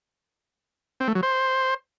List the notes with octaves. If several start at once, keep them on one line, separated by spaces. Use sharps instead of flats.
C4
A3
F#3
C5